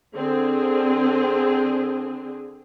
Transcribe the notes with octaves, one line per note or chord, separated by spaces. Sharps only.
D3 C4 G#4